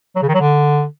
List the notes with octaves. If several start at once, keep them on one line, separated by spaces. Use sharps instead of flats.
F#3
C#3
D#3
F#3
D3